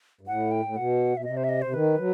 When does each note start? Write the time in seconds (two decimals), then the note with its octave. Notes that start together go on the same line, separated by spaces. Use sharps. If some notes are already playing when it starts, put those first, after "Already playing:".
0.21 G2
0.27 A2 F#5
0.51 G5
0.65 A2
0.76 B2 F#5
1.17 B2 E5
1.25 C3 D#5
1.37 C5
1.44 E5
1.49 D#5
1.62 C3 C5
1.74 D#3 B4
1.98 F#3